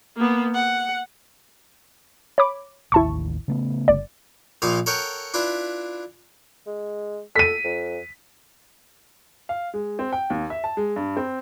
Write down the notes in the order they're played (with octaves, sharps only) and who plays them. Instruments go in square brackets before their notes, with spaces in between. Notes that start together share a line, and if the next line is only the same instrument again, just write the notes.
[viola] A#3 B3
F#5
[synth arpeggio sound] C#5 B5 D6
[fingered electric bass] A1 D#2 [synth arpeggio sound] E4 A5 C#6
[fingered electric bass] C#3 A3 B3
[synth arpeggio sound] G1 D5
[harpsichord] A#1 A#2 D#4 D#5 F5
A4 A#4 C#5 F#5 G5
D4 E4 F4 B4
[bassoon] G#3
[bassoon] A4 [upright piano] B6 D#7
[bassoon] F2
[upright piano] F5
G#3
C4
G5
D#2
E5
A5
G#3
G2
C4